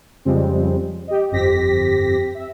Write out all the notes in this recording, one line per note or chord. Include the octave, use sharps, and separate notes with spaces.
F2 C#3 F3 G3 G#3 C4
G4 D#5
G1 F2 C4 G4 A#6 B6
E5